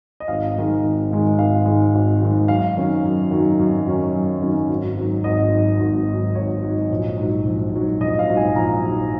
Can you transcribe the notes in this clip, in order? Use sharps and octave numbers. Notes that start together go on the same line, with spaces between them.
D#5
G#1 F5
G#2 D#3 G#3
G#1
G#2 D#3 G#3
G#1 F5
G#2 D#3 G#3
G#1
G#2 D#3 G#3
F#2 F5
D#3 F#3 C#4
F#2
D#3 F#3 C#4
F#2
D#3 F#3 C#4
F#2
D#3 F#3 C#4
G#1
G#2 F#3
G#1 D#5
G#2 F#3
G#1
G#2 F#3
G#1 C#5
G#2 F#3
A#1
G#2 F#3
A#1
G#2 F#3
A#1 D#5
F5
G#2 F#3
G#5
A#1 A#5
G#2 F#3